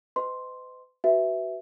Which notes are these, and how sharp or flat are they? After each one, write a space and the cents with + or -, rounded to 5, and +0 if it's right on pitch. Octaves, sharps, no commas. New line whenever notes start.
B4 +45 D#5 +0 C6 +0
F#4 +25 B4 +0 E5 +0